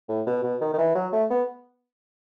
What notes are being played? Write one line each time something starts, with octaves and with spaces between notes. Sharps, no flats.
A2
B2
B2
D#3
D#3
E3
F#3
A3
B3